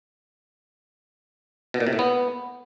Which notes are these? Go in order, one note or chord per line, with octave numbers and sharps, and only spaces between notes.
B2
A#2
C3
A2
B3